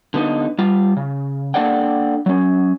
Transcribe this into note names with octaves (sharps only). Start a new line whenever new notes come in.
D3 B3 D#4
G3 F4
C#3
A#3 D4 A4 D5 F#5 G5
F#3 C#4